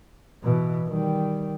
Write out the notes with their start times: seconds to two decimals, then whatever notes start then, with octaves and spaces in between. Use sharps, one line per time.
0.43 B2 E3
0.88 D#3 G3